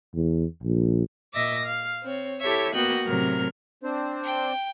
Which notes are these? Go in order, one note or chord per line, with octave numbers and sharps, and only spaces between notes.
E2
A#1
A#2 D#5 E5 D6 A#6
F5
C4 C#5
E4 G4 A4 C#5 E5
A#3 B3 F#4 D#5 G5 F#6
A2 C3 F#3 A#4 F6
C4 D4 C5
G5